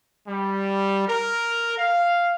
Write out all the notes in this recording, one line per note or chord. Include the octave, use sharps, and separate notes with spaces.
G3
A#4
F5